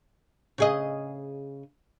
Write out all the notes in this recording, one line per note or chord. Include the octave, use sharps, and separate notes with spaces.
C#3 G#4 D#5